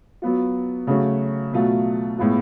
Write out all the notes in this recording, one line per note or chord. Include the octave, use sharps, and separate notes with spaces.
F#3 B3 F4
C#3 F#3 A3 C#4 F#4
B2 F#3 A3 F4
A2 G#3 B3 F4